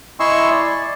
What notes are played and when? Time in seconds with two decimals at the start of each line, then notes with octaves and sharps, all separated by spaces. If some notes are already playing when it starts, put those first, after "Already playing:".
0.20 E4 D#5 G#5 C6 C#6 E6
0.50 D5